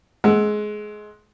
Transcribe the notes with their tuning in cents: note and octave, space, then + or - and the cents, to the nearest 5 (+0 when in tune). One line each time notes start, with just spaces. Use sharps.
G#3 +20 F#5 +0 E6 +0